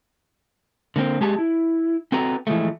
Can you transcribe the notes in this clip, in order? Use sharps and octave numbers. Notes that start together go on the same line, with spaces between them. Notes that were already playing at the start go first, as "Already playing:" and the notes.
D3 A#3 C4
G#3 G4 G#4 A5
E4
C4 F#4 A4 B4 A#5
E3 F3 G#3 A3